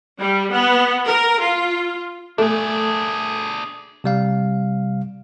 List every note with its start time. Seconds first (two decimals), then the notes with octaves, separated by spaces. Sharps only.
0.21 G3
0.53 B3
1.07 A#4
1.42 F4
2.38 A3 D4 G#4
4.04 C3 G3 F5